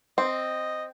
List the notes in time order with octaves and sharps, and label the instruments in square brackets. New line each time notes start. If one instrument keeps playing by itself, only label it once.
[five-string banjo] C4 [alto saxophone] D#5